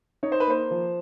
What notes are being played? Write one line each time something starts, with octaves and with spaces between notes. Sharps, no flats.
D#4 C#5
C5
B4
A#3 C5
F3